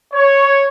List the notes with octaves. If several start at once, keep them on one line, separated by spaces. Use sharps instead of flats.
C#5